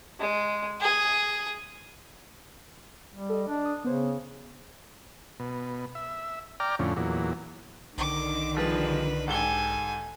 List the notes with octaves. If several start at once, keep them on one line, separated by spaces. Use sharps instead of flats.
G#3
G#4
G3
A4 D#5
D4
D#6
C#3 B3 C5 C#5
B2
E5
D5 G5 A#5 D6 F6
F2 A2 D3 C#4
E2 A#2 F#3
B1 D3 D#3 D6
F3 G3 G#4 B4
G#2 G4 A4 G#5 G7